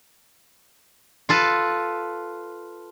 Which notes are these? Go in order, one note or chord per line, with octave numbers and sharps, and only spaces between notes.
F4 A4 B4